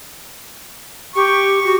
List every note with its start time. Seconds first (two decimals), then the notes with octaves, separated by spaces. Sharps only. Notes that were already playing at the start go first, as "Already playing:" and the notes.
1.16 G4 C#6
1.65 F#4